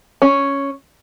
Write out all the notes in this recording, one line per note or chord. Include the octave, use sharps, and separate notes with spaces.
C#4